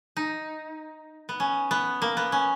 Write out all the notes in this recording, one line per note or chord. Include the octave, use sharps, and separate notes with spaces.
D#4
B3
C#4
B3
A#3
B3
C#4